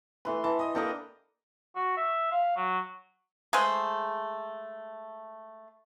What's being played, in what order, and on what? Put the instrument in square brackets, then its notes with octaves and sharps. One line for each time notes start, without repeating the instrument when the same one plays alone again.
[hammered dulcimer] E3 C6 [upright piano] A3 B4
[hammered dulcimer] E3 [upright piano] A5
[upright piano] D#5 D#6
[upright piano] A#3 D4 A4 [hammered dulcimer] G4 A#4 D#5
[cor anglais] F#4
E5
F5
F#3
[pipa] G#3 A3 G#4 C5